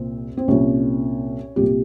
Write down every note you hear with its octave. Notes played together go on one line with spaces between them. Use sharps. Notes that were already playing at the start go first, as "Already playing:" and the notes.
Already playing: C2 A#2 C4
C4
C2 A#2 C#4
C2 A#2 G4